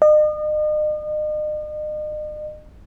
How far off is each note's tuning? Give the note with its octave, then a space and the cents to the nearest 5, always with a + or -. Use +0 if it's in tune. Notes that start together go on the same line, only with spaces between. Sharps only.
D#5 -40